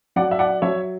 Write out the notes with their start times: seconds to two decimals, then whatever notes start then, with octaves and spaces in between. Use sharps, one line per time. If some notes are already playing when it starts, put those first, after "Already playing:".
0.16 F#3 D5 F#5
0.31 E5
0.39 D5 F#5
0.62 F#3 C#5 E5